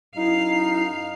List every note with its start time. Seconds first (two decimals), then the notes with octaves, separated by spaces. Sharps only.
0.16 F#2 D#4 E4 F5